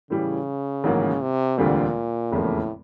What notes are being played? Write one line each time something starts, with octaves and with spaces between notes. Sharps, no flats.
A2 C#3 E3 G3
A1 G#2 D#3 F#3 A#3
C3
E1 D2 A#2 D3 G3 C4
F1 E2 A2 C#3 F3 A#3